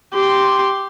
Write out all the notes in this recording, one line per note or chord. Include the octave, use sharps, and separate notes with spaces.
G4 C6